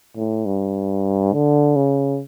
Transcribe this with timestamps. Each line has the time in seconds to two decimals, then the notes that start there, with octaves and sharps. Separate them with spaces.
0.16 A2
0.46 G2
1.33 D3
1.76 C#3